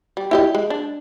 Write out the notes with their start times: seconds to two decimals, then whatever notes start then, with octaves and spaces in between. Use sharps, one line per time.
0.17 G3
0.31 E4 G4 D#5
0.55 G#3
0.70 D4